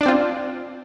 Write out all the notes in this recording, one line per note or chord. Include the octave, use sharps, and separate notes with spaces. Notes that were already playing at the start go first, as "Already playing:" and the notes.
C4 D4 F4 D5